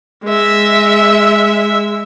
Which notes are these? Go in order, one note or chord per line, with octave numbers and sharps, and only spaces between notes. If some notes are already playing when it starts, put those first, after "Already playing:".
G#3 E5